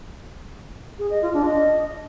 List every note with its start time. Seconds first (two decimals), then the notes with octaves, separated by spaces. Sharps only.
0.99 G#4
1.11 D#5
1.22 F4
1.34 D4
1.45 D#5